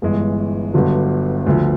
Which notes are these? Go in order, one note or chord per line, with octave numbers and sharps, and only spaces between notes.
G1 G2 E3 G#3
G1 G2 D3 F#3
D2 D3 F3